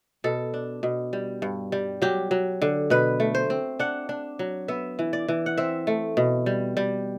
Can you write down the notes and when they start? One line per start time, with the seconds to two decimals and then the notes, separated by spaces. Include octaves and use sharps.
0.24 B2 A4
0.54 D4
0.83 B2
1.13 G3
1.42 G2
1.72 G3
2.02 F#3 G4
2.31 F#3
2.62 D3
2.90 B2 B4
3.20 A3
3.35 C5
3.50 C4
3.79 D4 F#5
4.09 D4
4.39 F#3
4.68 B3 E5
4.99 E3
5.13 D5
5.28 E3
5.46 F#5
5.58 C4 E5
5.87 A3
6.17 B2
6.46 G3
6.77 G3